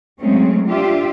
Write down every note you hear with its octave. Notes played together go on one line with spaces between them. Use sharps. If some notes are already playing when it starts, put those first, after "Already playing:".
F#3 G#3 A3 C4 C#4
D4 F4 G4 E5